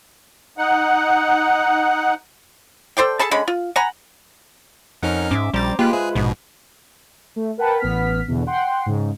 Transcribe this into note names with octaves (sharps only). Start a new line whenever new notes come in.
D#4 F#5
A4 C5 D5 G5
G#4 A4 A5 B5
D3 G#3 C#4 B5
F4
F#5 G#5 A#5 B5
F2 C#4 D#4 A#4 F#5 F6
G#2 C#4 E5 D6
A#1 G3 C5 A#5 D6 A6
G#3 A#3 F4 G4 B4 G5 F#6
G#4 C5 E5
A#1 G#2 B2
A3
A#4 B4 F#5 G5 A5 B5
A1 B3 F6 B6
E2 B2 D3
F#5 G5 C6
G#2 C#3